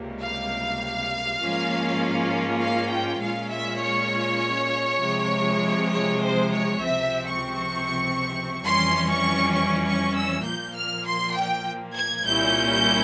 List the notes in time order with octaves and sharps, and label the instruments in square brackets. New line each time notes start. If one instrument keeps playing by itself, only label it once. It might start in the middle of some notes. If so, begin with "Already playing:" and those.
Already playing: [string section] C#2 C3 G3 A#3
F5
G#2 F3 A#3 C#4 F4
F5
G5
A#2 G#3 C#4 F4 F5
E5
C#5
C3 F3 G#3
C#5
C5
C#5
C#2 C3 F3 C4 E5
C#6
F2 E3 G3 C#4 C6
C#6
C#6
C#6
E6
A#2 F3 A#3 G6
F6
C6
G5
G#6
C2 A#2 G3 C#4 E4 G6